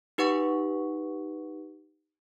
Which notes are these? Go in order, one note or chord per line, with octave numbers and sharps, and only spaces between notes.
D#4 G4 B4 F#5 C#6